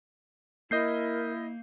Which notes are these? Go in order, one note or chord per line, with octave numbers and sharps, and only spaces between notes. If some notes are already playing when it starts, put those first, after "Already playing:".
A#3 E4 A#4 D#5 G6 C7